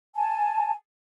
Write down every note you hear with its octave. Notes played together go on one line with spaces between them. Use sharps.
G#5 A5